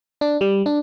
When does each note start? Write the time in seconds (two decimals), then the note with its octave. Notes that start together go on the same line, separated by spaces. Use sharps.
0.21 D4
0.41 G3
0.66 D4